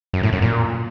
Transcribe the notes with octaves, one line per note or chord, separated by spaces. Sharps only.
F#2
A2
F#2
A#2